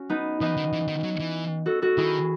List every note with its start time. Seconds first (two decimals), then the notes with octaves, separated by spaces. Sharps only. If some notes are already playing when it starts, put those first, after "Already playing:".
Already playing: C#4 F#4
0.10 B3 D#4
0.41 E3 B3 D#4
0.57 D#3
0.73 E3
0.88 D#3
1.04 F#3
1.20 E3
1.66 F#4 A4
1.82 F#4 A4
1.97 D#3 E4 G#4